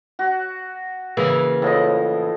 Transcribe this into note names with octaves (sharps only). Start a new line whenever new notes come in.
F#4
C#3 E3 A#3
A2 F3 D#5